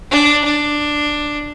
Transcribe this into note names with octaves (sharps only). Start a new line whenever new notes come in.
D4
D4